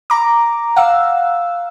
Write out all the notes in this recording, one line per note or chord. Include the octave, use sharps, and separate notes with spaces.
A#5 D6
F5 F#5 E6